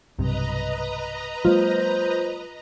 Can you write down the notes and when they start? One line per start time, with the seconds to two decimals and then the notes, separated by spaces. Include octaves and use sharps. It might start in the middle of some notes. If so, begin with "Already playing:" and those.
0.19 B1 G2 C3 B4 D#5 A#5
1.45 F#3 G#3 A#3 F4 C5